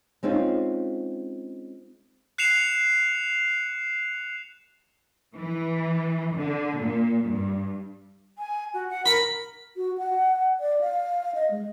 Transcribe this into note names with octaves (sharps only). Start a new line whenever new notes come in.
G#3 C4 C#4 D#4 F4
F#6 C7 C#7 E7 F7
E3
D3
A#2
G2
G#5
F#4
F#5
A#4 B5
F#4
F#5
D5
F5
D#5
G#3